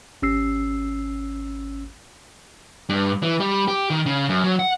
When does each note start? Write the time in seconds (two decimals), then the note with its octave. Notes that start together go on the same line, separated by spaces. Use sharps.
0.22 G#1 C#4 E6 C7
2.89 G2
3.23 E3
3.40 G3
3.68 G4
3.90 D#3
4.06 C#3
4.29 F#2
4.44 F#3
4.59 F#5